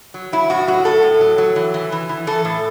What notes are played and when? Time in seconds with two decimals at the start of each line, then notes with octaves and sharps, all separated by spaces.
0.14 F#3
0.32 F#3 E4
0.50 A2 F#4
0.67 F#3 F#4
0.85 A2 A4
1.03 A2
1.21 F#3
1.38 F#3
1.56 E3
1.74 E3
1.92 E3
2.09 E3
2.27 E3 A4
2.45 A2